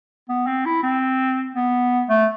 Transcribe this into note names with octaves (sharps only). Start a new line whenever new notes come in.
B3
C4
E4
C4
B3
A3